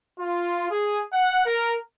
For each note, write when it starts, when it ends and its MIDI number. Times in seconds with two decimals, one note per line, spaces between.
0.19 0.67 65
0.70 0.99 68
1.13 1.44 78
1.46 1.76 70